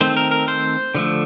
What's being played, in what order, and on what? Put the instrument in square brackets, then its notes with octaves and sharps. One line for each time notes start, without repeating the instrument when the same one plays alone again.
[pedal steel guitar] D#3 A3 C4 C5
A#4
A#4
C5
D3 F3 A3